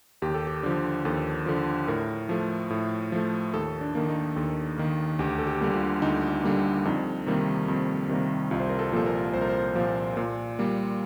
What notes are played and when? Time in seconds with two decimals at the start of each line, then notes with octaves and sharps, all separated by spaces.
0.22 D#2 G4
0.34 A4
0.47 G4
0.63 D3 F3
1.05 D#2 A4
1.46 D3 F3
1.88 A2 A#4
2.29 F3 A3
2.70 A2
3.12 F3 A3
3.54 D#2 A4
3.81 D4
3.95 D#3 A#3
4.09 D#4
4.36 D#2 A4
4.78 D#3 A#3
5.19 D2 G4
5.39 A4
5.47 G4
5.61 D3 G3 A#3
5.75 F4
6.02 D2 D#4
6.44 D3 G3 A#3
6.85 F2 D#4
7.27 C3 D#3 G3 A#3
7.68 F2
8.09 C3 D#3 G3 A#3
8.51 C2 F4
8.60 C5
8.69 A#4
8.79 A4
8.92 A#2 F3 A#3 A4
9.06 A#4
9.34 C2 C5
9.41 A#4
9.49 C5
9.75 A#2 F3 A#3
10.17 A#2
10.59 G3 A#3